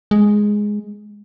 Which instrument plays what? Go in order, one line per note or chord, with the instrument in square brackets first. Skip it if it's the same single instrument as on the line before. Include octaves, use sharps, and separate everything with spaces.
[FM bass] G#3